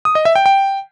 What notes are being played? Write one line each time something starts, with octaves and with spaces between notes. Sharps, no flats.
D#6
D#5
E5
G5
G5